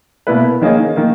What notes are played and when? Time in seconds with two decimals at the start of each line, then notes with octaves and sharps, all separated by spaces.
0.27 B2 A#3 E4 B4
0.62 D#3 A#3 C#4 G#4 D#5
0.96 D#3 A#3